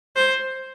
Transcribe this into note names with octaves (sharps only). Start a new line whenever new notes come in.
C5